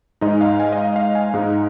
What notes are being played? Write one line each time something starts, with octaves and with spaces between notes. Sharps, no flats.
G#2 G#3 D#4 D#5
F5
G#5
D#5
F5
F5
G#5
G#2 G#3 D#4